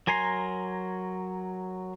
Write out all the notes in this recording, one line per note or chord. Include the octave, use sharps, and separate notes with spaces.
F#3 A#4 G#5 A#5 C6